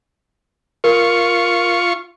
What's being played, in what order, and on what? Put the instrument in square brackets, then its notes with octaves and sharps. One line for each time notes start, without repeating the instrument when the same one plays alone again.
[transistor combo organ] F4 C#6 [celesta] A#4